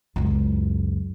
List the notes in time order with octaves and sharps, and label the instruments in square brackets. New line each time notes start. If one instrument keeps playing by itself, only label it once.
[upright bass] C#2 F#2